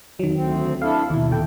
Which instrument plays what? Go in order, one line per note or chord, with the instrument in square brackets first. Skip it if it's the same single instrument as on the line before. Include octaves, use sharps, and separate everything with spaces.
[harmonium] F2 [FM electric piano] D#3 F#3
[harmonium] D2 C4
[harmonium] D4 E4 A4 [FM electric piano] F5
[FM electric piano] D#2 B2 [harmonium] E4
[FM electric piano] D#2 A#2 G5 [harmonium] A4